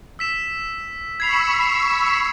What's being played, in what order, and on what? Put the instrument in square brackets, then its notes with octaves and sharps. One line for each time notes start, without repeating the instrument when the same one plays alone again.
[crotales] E6 B6 E7
[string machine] B5 C#6 E6 [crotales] G#6 C7 F7